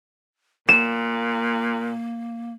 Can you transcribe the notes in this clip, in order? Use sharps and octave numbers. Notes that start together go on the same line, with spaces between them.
A#2 A#3 E7